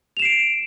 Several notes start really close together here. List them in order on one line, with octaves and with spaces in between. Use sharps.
F7 E7 C7 D7